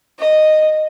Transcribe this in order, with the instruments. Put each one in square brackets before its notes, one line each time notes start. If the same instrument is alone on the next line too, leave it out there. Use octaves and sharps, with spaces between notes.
[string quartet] D#5